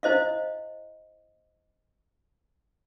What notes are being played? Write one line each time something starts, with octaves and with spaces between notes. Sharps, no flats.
E4 C5 D#5 F5